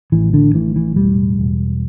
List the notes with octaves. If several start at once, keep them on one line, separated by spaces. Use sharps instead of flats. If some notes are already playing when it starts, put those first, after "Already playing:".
A1 E3
D3
A2 E3
E3
E1 G3
E1